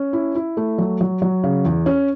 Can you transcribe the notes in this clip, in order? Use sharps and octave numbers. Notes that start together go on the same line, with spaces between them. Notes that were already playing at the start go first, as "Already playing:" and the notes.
Already playing: C#4
E4
E4
A3
F#3
F#3
F#3
C#3
E2
C#4